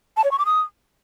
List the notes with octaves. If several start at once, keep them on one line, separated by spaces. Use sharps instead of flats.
A5
C#5
C#6
D6
D#6